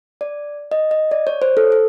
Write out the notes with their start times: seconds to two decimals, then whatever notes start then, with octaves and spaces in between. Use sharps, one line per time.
0.21 D5
0.72 D#5
0.91 D#5
1.11 D5
1.27 C#5
1.42 C5
1.57 A4
1.72 A4